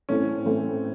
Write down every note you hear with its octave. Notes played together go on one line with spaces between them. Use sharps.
A2 E3 A3 C4 C#4 E4
A2 E3 A3 C4 E4